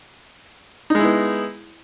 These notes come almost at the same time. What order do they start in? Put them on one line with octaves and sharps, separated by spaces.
D#4 G#3 E4 B3